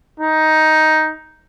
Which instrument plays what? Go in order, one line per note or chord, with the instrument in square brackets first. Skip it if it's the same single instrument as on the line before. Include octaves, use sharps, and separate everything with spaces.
[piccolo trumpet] D#4